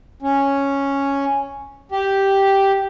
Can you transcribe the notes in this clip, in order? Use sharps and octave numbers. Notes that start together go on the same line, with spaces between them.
C#4
G4